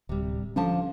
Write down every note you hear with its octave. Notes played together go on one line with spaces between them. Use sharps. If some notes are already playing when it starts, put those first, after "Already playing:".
D1 C3 G3
D3 F3 C#4 A5